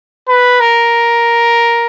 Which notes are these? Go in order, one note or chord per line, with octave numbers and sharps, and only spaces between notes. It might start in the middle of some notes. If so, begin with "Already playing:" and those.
B4
A#4